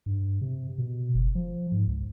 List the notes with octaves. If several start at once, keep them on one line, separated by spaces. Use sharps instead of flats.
G2
C3
B2
F#1
F3
G#2
C#2